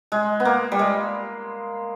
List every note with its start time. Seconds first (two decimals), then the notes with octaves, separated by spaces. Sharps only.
0.12 G#3
0.40 B3
0.45 A#3
0.72 G3
0.79 G#3